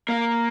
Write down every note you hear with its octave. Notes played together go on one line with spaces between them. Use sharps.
A#3